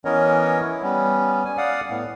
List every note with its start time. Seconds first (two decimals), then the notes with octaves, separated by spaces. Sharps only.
0.05 E3 B3 C#4 A#4 C#5 D#5
0.62 E4
0.82 G3 B3 C#4
1.45 G#5
1.58 D5 F5 F#5 D#6
1.90 A2 B3